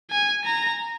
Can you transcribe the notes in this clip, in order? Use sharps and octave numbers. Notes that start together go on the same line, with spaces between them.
G#5
A#5